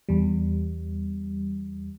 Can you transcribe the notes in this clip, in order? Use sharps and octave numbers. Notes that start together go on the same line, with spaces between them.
E2 G3